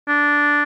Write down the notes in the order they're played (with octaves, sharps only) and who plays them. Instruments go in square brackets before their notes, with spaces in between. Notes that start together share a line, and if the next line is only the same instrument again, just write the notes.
[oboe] D4